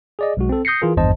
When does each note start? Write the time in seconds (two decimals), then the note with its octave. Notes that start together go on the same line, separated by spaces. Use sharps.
0.19 G#4 D5 D#5
0.37 B1 G#3 F#4
0.49 C4 A4
0.65 D#6 G6 A#6 C7 C#7
0.82 E3 F4 G#4 A#4
0.97 G#1 E2 G2 C5 D#5 A5